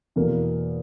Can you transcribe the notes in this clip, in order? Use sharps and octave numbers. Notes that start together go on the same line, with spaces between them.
E2 B2 A#3